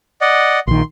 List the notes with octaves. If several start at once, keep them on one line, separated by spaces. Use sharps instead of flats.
D5 D#5 F#5
A#1 D#3 C6